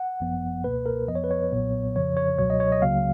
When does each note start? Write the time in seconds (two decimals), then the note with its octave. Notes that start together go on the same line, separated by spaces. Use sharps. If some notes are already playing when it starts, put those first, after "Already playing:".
Already playing: F#5
0.20 G#1 F#2 F3 B3
0.64 C#2 B2 A#3 B4
0.86 A#4
1.08 F2 F3 B3 D#5
1.15 C#5
1.24 B4
1.31 C#5
1.52 B1 A#2 F#3 B3
1.95 F2 C#3 F3 C#5
2.17 C#5
2.38 C#2 B2 F#3 C#5
2.50 D#5
2.60 C#5
2.72 D#5
2.82 C#2 C#3 F#3 A#3 F5